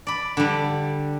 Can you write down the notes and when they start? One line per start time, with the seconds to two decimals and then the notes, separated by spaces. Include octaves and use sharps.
0.07 D5 B5
0.37 D3 G3